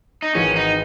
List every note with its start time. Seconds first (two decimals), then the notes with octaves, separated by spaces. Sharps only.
0.22 D#4
0.35 G#1 G#2 E3 G#3 C#4
0.56 D#4